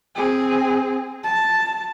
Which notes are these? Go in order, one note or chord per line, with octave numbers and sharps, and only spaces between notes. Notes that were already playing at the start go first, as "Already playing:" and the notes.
C4 G#4
A5